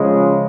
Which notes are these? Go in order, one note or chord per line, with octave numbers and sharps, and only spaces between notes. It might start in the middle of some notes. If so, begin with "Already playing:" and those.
Already playing: C#3 F3 G#3